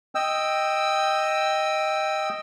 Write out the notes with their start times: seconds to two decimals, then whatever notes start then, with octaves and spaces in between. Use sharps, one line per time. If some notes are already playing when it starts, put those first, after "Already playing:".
0.15 D#5 G5 E6